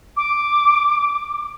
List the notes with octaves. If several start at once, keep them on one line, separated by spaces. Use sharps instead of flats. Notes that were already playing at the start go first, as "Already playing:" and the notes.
D6